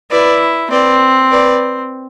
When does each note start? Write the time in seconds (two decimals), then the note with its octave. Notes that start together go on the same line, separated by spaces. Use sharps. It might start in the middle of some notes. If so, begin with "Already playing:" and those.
0.11 E4 B4 D5
0.71 C4 B4 D5
1.31 B4 D5